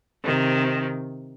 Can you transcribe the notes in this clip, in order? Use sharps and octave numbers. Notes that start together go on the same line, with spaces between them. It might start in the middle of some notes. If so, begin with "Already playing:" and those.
C3 D#3